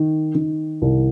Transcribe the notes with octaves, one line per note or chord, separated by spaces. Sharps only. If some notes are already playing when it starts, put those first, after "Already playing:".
Already playing: D#3
D#3
C2